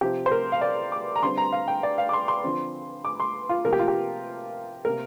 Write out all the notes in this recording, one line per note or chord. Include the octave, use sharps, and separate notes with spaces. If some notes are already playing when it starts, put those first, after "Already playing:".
C3 F3 C4 G4
C5
A#4
F5
D5
D6
A#5
D3 G3 C4 C6
A#5
F5
G5
D5
F5
D6
C6
C6
D3 F3 C4
D6
C6
F4
C3 F3 A#3 A#4
G4
F4
G4
C3 A#3 A#4